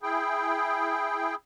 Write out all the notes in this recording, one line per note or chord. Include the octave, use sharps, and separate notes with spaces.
E4 G#4 G5